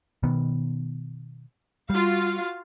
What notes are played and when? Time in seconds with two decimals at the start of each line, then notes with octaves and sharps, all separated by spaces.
0.23 B2 D#3 B3
1.90 G3 F4 F#4 F5